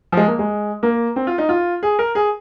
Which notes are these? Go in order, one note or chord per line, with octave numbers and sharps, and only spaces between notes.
F3
G#3
A#3
G#3
A#3
C4
F4
D#4
F4
G#4
A#4
G#4